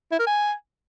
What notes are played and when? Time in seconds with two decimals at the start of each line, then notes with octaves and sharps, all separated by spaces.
0.11 E4
0.19 A#4
0.27 G#5